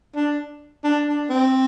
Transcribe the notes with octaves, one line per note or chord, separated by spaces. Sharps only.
D4
D4
D4
C4